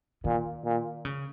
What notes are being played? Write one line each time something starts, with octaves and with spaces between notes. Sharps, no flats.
A#2 D#3
A#2
C#3